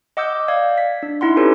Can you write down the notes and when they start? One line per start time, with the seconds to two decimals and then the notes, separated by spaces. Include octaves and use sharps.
0.17 D#5 F#5 D6 E6 G6
0.48 D5 F5 G#6
0.78 B6
1.03 D4
1.21 D#4 E4 F#5 C6
1.37 C#4 F#4 G4 A4 B4 C#5